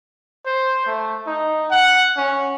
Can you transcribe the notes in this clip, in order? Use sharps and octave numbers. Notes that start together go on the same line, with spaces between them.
C5
A3
D#4
F#5
C#4